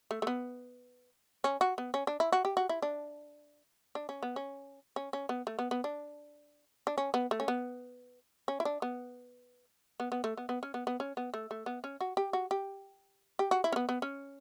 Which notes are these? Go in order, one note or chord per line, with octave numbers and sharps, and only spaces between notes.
A3
A3
B3
C#4
F#4
B3
C#4
D4
E4
F#4
G4
F#4
E4
D4
D4
C#4
B3
C#4
C#4
C#4
B3
A3
B3
B3
D4
D4
C#4
B3
A3
C#4
B3
C#4
E4
D4
B3
B3
B3
A3
B3
B3
C#4
B3
B3
C#4
B3
A3
A3
B3
C#4
F#4
G4
F#4
G4
G4
F#4
E4
C#4
B3
B3
C#4